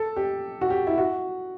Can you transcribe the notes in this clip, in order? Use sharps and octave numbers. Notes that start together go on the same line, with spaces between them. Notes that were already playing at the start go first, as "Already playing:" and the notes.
Already playing: A4
G4
F#4
G4
E4
F#4